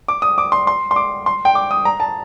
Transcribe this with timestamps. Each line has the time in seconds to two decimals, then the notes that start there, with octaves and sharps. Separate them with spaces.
0.08 D6
0.22 D#6
0.38 D6
0.52 C6
0.67 C6
0.91 C6
0.96 D6
1.26 C6
1.45 G5
1.55 D6
1.71 D#6
1.85 A#5
2.00 A5